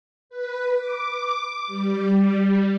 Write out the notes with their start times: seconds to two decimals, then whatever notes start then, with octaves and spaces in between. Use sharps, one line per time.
0.30 B4
0.77 D6
1.67 G3